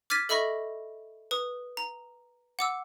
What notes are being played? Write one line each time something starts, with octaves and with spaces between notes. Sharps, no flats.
D6 F6 G#6 A6 B6 D#7
A4 D#5 E5 B5 C#6 A#6
B4 D#6
A#5
F#5 D6 E6